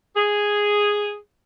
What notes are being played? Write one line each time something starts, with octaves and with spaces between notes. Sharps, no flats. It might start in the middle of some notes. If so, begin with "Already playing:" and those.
G#4